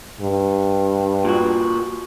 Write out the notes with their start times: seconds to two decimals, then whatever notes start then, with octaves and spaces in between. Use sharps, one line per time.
0.21 G2
1.25 A#2 F#4